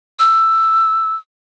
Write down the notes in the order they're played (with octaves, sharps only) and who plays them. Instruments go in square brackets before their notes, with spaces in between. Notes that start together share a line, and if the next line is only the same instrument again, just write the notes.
[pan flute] E6